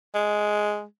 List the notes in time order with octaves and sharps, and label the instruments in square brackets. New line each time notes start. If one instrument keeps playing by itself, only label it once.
[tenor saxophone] G#3